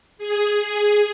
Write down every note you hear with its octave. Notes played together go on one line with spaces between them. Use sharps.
G#4
G#4